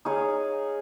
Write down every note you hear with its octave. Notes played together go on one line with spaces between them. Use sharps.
D#4 G#4 C#5 F5